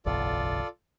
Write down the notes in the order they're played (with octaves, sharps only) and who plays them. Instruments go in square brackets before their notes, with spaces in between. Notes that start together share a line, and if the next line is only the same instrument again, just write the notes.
[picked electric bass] F#1 B1 E2 [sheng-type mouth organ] F4 A4 D5